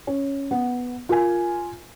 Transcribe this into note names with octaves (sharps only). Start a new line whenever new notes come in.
C#4
B3
F4 A#4 G#5